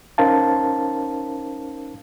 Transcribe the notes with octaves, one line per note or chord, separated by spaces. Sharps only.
C#4 D#4 A#4 C5 F5 A5